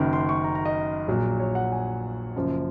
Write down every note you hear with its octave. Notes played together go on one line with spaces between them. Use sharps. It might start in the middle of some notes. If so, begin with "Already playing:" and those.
Already playing: F#1 F#2 D#3
C6
C#6
A#5
A#5
D#5
A#1 A#2 F#3
C#5
F#5
G#5
F#1 F#2 F3